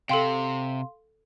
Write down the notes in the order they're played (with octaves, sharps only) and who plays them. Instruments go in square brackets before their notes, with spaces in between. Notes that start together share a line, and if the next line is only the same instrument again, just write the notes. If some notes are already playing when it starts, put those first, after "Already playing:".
[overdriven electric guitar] C3 [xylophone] A4 G5 [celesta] F5 C6